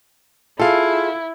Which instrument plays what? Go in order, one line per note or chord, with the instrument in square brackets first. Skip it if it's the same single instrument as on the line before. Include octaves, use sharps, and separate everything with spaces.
[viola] E4 [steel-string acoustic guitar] F4 G#4 [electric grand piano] A4 F5